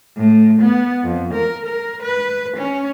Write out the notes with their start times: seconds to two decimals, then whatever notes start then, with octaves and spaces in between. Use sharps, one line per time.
0.16 A2
0.61 B3
1.04 F2
1.33 A#4
1.66 A#4
2.02 B4
2.57 C#4